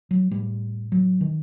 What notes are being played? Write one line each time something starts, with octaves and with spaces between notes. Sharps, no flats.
F#3
A2 G3
F#3
D#3